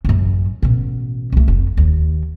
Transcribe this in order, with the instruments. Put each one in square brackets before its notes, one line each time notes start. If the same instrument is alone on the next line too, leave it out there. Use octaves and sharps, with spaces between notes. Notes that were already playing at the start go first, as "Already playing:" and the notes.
[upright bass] A1 F#2
A1 B2
C2 A3
F1
D#2